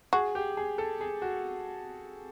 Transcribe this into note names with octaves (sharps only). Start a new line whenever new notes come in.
F#4 G#4
G4
G#4
A4
G#4
F#4